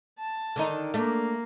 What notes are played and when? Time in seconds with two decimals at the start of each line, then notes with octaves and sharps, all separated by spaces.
0.19 A5
0.56 D3 D#3 D#4
0.94 A3 A#3 D4